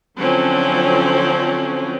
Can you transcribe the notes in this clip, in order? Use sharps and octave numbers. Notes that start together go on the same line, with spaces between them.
D3 F3 F#3 C4 C#4